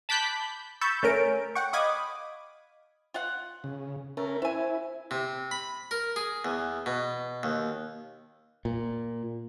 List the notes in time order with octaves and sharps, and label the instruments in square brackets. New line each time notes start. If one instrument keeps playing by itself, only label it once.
[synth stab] A5 B5 D6 F#6 G6 B6
B5 C#6 E6 G6 A6
A3 C#4 A#4 D7
F#5 G5 C#6
D#5 F5 B5 D6 D#6 G#6
[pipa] F4 F5 F#5
[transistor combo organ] C#3
[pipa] A3 [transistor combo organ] C#4 A#4
[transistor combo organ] E4 [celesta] C5 [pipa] E5 G#5
[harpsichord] C3
B5
A#4
G#4
E2
B2
D#2
[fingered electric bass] A#2